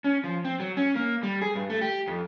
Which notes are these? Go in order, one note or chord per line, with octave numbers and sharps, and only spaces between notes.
C#4
F3
C4
F#3
C#4
A#3
G3
G#4
G2
A3
G4
F2